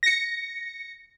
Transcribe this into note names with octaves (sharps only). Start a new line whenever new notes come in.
A#6 C#7